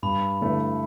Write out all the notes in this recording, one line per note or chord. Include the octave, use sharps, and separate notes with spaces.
G2 B5
D3 A3 E4 B4